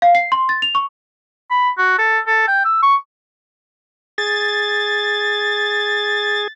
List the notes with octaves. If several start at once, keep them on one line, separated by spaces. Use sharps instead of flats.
F5
C7
C6
A6
F7
C#6
B5
F#4
A4
A4
G5
E6
C#6
G#4 A6